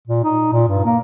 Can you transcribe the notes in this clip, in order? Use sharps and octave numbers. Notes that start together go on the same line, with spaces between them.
A#2
D#4
A#2
G2
A#3